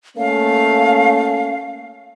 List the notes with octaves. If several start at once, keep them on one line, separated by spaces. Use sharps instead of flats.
A3 A#3 C#4 F5